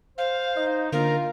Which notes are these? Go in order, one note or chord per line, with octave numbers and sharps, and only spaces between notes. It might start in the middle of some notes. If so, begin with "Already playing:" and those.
C5 F5
D#4 D#5
D3 A#3 F4 A#4